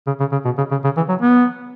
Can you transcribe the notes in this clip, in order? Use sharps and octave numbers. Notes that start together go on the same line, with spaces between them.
C#3
C#3
C#3
B2
C#3
C#3
C#3
E3
F#3
B3